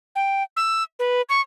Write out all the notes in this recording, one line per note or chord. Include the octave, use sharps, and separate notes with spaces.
G5
E6
B4
C#6